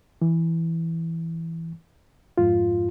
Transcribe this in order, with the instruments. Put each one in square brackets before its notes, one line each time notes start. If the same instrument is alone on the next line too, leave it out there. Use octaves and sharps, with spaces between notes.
[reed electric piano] E3
F2 G#2 F4